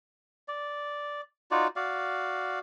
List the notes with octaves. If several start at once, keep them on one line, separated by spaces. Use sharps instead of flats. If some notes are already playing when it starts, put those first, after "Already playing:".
D5
D#4 F4 F#4 D5
F#4 D5 F5